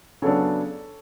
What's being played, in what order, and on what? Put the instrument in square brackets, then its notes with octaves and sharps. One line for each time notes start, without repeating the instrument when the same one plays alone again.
[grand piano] C#3 F#3 B3 D4 A4 C#5